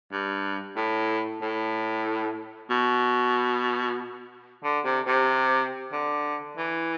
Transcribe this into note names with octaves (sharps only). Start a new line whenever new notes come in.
G2
A2
A2
B2
D3
C3
C3
D3
E3